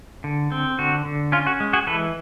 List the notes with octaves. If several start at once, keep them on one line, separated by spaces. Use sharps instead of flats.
D3
C4
D3 F#4
D3
C#4 F4
F#4
G#3
F#4 G#4
E3 A4 B4